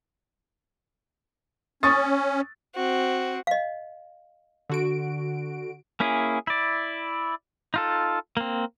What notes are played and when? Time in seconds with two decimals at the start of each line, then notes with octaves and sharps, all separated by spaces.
1.83 C#4 C#6 D#6 A6
2.75 C4 F#4
3.47 D#5 F5
4.69 D3 F#4 D7
6.00 A#3 C#4 E4 G#4
6.47 E4 D5
7.74 D#4 F4 A4
8.37 A#3 C4